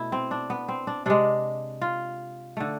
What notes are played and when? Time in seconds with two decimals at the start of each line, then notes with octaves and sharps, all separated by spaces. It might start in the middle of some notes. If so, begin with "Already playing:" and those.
Already playing: B2 A3 E4
0.12 C4
0.31 D4
0.50 B3
0.68 C4
0.87 D4
1.06 C3 G#3 D4
1.81 F4
2.57 D3 A3